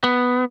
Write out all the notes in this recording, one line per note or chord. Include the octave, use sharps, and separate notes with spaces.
B3